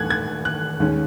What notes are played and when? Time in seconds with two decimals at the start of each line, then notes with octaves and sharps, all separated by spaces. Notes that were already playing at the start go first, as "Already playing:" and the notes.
Already playing: D#2 E3 A3 F#6 G#6
0.10 G#6
0.45 F#6
0.80 D#2 D#3 G#3 C#4